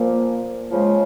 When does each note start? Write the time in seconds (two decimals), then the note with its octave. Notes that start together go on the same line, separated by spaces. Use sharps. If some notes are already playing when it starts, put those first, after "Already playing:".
Already playing: A#2 F3 A#3
0.70 C#3 F3 G#3